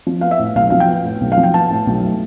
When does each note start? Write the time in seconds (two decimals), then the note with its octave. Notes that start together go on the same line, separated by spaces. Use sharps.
0.07 F3
0.21 B3 F5
0.31 E5
0.39 A2
0.55 B1 F5
0.70 F3 F5
0.80 G5
0.88 B3
1.05 A2
1.21 B1
1.32 F5
1.37 F3
1.43 G5
1.54 B3 A5
1.70 A2
1.87 B1
2.04 A3